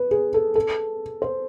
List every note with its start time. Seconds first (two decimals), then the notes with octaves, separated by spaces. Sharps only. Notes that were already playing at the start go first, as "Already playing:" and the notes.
Already playing: B4
0.11 G#4
0.34 A4
0.55 A4
1.22 C5